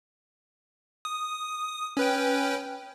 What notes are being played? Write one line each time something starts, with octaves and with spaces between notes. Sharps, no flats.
D#6
C#4 B4 G5